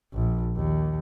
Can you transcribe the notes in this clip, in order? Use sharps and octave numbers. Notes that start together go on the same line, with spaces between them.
A#1
D#2